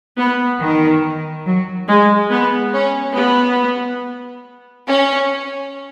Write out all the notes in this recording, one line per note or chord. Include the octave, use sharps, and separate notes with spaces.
B3
D#3
F#3
G#3
B3
C#4
B3
C#4